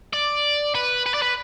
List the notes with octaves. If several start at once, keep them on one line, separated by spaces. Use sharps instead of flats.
D5
B4
B4
D5
B4